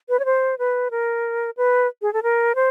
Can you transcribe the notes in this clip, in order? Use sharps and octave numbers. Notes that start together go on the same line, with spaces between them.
B4
C#5
C5
B4
A#4
B4
G#4
A4
A#4
C5